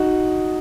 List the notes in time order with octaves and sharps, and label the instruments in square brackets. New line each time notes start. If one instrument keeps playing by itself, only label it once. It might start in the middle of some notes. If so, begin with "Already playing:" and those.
Already playing: [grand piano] D#4 F#4